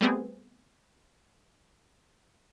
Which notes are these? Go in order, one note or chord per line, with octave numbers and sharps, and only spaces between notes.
G3 A3 B3 C4 G#4